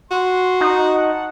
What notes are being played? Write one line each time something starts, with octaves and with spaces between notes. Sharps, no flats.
F#4 C6
D#4
F#5 A5